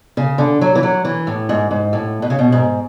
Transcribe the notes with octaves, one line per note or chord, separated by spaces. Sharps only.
C#3
D3
F#3
E3
F#3
E3
A2
G#2
G#2
A2
B2
C#3
B2
G#2